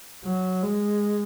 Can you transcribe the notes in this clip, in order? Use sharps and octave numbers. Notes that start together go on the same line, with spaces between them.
F#3
G#3